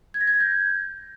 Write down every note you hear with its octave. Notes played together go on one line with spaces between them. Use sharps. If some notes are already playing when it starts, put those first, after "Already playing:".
G#6
A#6
G#6
A#6
G6